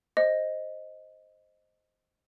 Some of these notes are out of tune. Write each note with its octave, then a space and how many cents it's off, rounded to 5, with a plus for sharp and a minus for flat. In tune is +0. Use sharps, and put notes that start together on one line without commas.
C5 +0 D#5 +0